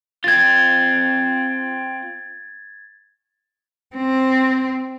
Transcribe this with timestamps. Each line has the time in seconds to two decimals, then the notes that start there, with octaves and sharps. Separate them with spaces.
0.24 C4 F4 G#6 A6
3.96 C4